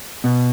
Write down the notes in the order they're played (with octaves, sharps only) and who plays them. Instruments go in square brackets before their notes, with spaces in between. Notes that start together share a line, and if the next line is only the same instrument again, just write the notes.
[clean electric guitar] B2